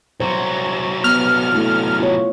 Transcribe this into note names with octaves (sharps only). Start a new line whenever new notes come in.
C2 F#3 C5
B3 G4 F6
A3 E4 F#4
F4 C#5